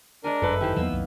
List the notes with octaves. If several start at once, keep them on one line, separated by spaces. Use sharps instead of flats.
G#3 D4 A#4 C5 G#5
G1 F#2 A4 B4 E5
D#3 E4 G4 C5
E2 E3 F#3 A#3 B3 E6
C2 F#2 F#3